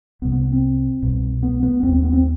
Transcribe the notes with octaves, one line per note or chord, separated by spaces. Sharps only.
C2 C3 B3
B3
C4
C2 B2
B3
B3
D#2 C4
C4
B3
C4